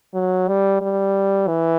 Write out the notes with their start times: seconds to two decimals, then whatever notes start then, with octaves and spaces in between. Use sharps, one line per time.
0.14 F#3
0.48 G3
0.82 G3
1.48 E3